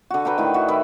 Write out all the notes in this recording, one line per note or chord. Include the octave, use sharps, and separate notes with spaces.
D3 F#4
A4 B4 G5 A#5
A2 D#3 E4
F#4
D#3 E4 B4